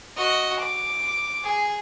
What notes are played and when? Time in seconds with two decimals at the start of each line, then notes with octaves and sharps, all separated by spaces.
0.17 F#4 D#5
0.60 D6
1.43 G#4